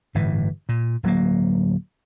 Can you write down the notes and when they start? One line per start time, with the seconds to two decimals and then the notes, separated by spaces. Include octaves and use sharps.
0.15 G1 A2 E3
0.69 A#2
1.03 D1 F#3 A#3